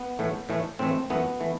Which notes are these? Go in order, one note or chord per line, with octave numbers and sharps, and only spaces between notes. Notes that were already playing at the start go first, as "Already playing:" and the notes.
Already playing: B3
A2 E3 A3
A2 E3 A3
A2 E3 A3 C4
F#2 E3 A3 B3
E3 A3